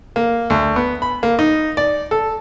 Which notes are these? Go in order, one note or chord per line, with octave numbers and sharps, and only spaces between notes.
A#3
D2
B3
B5
A#3
D#4
D5
A4